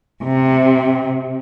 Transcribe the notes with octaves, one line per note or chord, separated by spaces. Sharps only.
C3